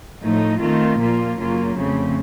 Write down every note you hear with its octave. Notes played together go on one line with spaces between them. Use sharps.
A2 F3 A3 D#4
D#3 A3 C4 F4
A#2 F3 A#3 F4
F#2 C#3 F#3 A#3 F4
F2 C#3 A3 C4